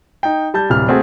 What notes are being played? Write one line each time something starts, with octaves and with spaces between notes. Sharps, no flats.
D#4 G5
G3 A5 G6
D1 C3 G3 F6
A3 C4 F#4 G#4